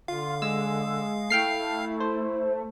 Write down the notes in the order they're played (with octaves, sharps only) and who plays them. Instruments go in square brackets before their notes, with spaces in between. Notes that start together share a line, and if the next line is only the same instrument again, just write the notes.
[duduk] D3 [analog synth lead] F4 [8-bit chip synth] F5
[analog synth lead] G#3 [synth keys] E6
[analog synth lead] A3 [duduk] E4 [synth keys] G5 F6 C7
[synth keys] C5